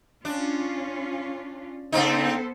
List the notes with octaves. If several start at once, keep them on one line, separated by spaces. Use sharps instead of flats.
C#4 D4 F4
C#3 B3 C4 D#4 A4 C5